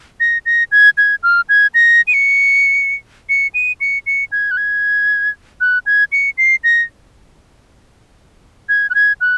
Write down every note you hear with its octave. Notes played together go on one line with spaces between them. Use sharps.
A#6
A#6
G#6
G#6
F6
G#6
A#6
D#7
C#7
C#7
D#7
C#7
C#7
G#6
F#6
G#6
F#6
G#6
C#7
C7
A#6
G#6
F#6
G#6
F#6